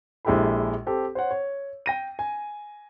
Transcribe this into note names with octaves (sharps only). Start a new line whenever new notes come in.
A#1 G#3 E4 G4 A4 B5
C4 G4 A4
C5 C#5 F#5
C#5
G5 A#6 D#7
G#5